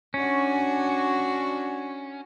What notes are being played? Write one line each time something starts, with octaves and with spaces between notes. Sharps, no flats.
C#4 D4 F#4